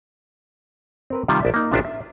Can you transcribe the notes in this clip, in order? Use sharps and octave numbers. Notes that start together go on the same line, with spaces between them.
C4 A#4 B4
C3 D#3 G3 F4
A#1 D5 E5
A#3 D#4
A1 C3 D4 F4 E5
E5